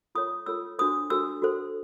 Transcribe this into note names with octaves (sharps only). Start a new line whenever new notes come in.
F4 A4 C#5 D#6
F4 A4 C#5 E6
D4 F#4 A4 C5 D#6
D4 F#4 A4 C5 E6
F#4 A4 C5